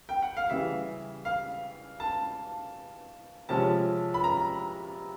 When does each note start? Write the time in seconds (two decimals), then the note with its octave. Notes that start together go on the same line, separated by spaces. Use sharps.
0.09 G5
0.22 F#5
0.37 F5
0.50 C#3 E3 G3 E5
1.25 F5
2.00 A5
3.49 C3 F3 G#3 C#4 A5
4.14 B5
4.24 A#5